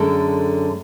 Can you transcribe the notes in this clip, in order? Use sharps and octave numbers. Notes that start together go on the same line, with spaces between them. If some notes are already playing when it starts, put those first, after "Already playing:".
Already playing: F#2 D3 G#3 A4